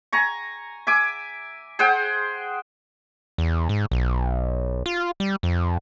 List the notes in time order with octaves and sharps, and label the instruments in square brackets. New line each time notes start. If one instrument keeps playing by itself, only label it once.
[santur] G#5 A#5 C#6
E5 G#5 D6
G#4 C5 F#5 G5
[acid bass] E2
G#2
B1
F4
G3
F2